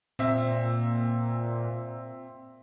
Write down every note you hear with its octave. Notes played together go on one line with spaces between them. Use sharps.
A#2 C4 E5